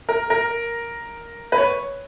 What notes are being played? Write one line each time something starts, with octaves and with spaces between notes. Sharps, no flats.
A#4
A#4
B4
C#5